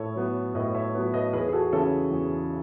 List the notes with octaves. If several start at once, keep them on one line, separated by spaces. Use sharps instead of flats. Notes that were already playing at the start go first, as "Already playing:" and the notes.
Already playing: A2 A4 C#5
F#3 B3
A2 B4 D#5
C#5 E5
F#3 B3
B4 D#5
E2 G#4 B4
G#4
F#4 A4
C#3 E3 A4 C#5
E2